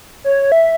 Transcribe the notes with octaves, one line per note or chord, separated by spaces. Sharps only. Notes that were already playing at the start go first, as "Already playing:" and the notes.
C#5
E5